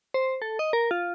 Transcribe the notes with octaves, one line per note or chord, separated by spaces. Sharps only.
C5
A4
D#5
A#4
F4